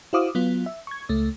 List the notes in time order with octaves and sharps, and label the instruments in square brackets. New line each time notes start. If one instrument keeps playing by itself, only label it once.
[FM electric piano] E4 F#4 C5 F5 D6 D#6
F#3 B3 F4
E5
C#6 G#6
C#2 A3